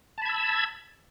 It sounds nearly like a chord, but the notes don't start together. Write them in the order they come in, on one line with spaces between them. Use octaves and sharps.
A5 B5 G#6 E6